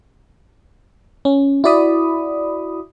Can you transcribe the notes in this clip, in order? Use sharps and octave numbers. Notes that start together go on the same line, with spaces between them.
C#4
E4 F#4 D5 B5 D#6